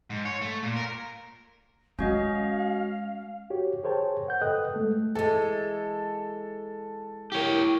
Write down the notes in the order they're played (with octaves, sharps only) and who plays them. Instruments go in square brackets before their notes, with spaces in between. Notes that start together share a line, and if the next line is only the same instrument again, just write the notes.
[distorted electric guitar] G#2
C#5
A3
A#2
A#4
[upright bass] G#3 [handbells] C#4 F#4 D#5 [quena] F5
[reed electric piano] F#4 G4 C#5
G#4 A#4 C5 C#5 G5 A5
C5 F#5 G6
A4 B4 D#5 G5 D#6 F#6
G#3 A3 A4
[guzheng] E3 G#3 [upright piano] A4
[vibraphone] E4 A#4 [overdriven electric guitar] G4 C#5